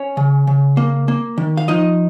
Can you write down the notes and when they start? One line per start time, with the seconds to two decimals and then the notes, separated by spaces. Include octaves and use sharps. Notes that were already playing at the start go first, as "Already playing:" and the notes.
Already playing: C#4 C#5
0.17 C#3
0.47 C#3
0.77 A#3
1.08 A#3
1.38 D#3
1.57 F5
1.68 F3 D#4 D#5